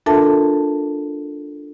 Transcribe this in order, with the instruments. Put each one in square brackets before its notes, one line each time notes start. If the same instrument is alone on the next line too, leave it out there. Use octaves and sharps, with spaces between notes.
[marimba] D4 F4 A4 A#4 E5 A5